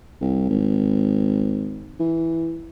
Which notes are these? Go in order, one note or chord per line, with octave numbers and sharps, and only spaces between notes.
C2
G#1
E3